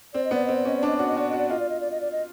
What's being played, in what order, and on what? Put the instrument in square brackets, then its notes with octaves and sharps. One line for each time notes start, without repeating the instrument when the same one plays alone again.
[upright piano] C4 [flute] D5
[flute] D#5
[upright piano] B3 [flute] D5
[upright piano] C4 [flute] D#5
[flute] D5
[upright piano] C#4 [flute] D#5
[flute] D5
[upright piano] D4 [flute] D#5
[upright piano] F#4 [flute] D5
[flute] D#5
[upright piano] F#4 [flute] D5
[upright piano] F#4 [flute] D#5
[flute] D5
[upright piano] F4 [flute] D#5
[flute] D5
D#5
D5
D#5
D5
D#5